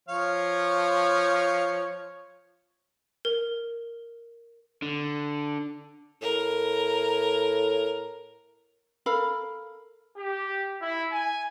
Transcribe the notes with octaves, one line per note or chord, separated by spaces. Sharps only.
F3 C#5 F5
A#4
D3
A2 A#4
A4 A#4 F5 B5
G4
E4
G#5